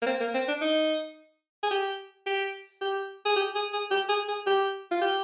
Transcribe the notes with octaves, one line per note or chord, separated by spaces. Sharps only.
A#3
C4
A#3
C4
D4
D#4
G#4
G4
G4
G4
G#4
G4
G#4
G#4
G4
G#4
G#4
G4
F4
G4